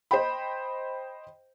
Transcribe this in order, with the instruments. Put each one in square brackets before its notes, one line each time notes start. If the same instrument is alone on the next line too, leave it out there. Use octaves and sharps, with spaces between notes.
[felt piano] C5 D#5 G5 B5